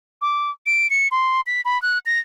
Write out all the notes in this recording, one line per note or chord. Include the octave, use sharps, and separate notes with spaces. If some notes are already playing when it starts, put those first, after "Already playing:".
D6
D7
C#7
C6
B6
B5
F#6
A#6